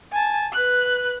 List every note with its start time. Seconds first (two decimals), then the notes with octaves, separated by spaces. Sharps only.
0.12 G#5 A5
0.53 B4 F#6